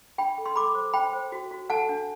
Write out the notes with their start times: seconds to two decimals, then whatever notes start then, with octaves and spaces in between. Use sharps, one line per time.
0.18 D4 G5 B5
0.38 A4
0.46 C6
0.56 A4 B5 D6
0.75 C5
0.93 C5 G5 B5
1.13 C5
1.32 F#4
1.51 F#4
1.70 A4 F#5 A5
1.89 D4